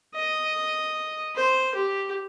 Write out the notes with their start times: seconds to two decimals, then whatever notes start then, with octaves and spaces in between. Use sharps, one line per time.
0.15 D#5
1.36 C5
1.75 G4